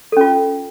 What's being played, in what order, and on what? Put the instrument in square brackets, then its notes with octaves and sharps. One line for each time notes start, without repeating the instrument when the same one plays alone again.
[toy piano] A4
C#4
F4